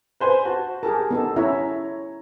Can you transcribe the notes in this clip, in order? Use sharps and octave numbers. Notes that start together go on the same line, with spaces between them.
B4 C5 G#5
F#4 A5
G4 G#4 A#4 A5
B3 D#4 A4
C#4 E4 C#5 E5 A#5